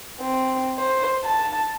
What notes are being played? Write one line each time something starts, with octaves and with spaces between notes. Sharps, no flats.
C4
C5
A5